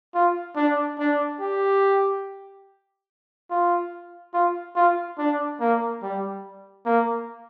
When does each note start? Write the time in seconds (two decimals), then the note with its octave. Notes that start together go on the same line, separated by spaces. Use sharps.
0.14 F4
0.56 D4
0.99 D4
1.40 G4
3.50 F4
4.34 F4
4.75 F4
5.18 D4
5.60 A#3
6.02 G3
6.85 A#3